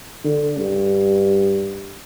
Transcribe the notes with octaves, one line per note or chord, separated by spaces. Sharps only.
D3
G2